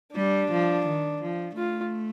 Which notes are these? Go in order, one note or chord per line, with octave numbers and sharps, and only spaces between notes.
G3 D4
F3
D#3
F3
A3 F4